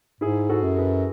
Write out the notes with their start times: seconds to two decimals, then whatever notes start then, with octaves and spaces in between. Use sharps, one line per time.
0.21 G#2 E4 G#4
0.49 F#4 A4
0.64 F#2
0.78 G#4 B4